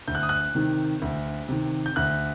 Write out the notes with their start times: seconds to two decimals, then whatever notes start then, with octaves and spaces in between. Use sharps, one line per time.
0.08 D2 G6
0.15 F#6
0.23 D#6
0.29 F#6
0.55 C3 D#3
1.02 D2
1.48 C3 D#3
1.86 G6
1.96 D2 F#6